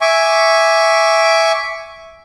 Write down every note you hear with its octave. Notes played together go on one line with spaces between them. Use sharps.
E5 G#5 C#6 D6